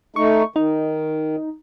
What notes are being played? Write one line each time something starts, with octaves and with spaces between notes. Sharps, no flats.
A3 D#4 C#6
D#3 D#4